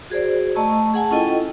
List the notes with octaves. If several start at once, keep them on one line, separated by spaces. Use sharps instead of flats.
F#4 G#4 C5 D5
A3 D#5 A5 A#5 C#6 E6
G#4 F#5 G#5 A5
C#4 E4 F4 A4 D#5 G5